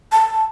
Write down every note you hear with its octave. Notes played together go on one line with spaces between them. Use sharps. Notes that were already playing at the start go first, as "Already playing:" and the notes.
A5